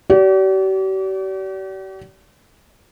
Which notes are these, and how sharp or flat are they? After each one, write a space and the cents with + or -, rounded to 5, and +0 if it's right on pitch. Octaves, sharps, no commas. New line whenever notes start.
G4 -45 D5 -35